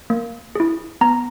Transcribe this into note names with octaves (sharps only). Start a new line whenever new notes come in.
A#3
E4 G#4
B3 A#5